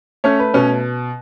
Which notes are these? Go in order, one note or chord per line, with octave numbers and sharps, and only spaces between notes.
A3 C#4 C#5
B4
B2 C#4 C#5